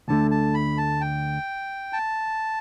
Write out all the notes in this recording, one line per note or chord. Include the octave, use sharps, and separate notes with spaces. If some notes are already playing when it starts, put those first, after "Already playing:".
D2 D3 A3 A5
A5
B5
A5
G5
A5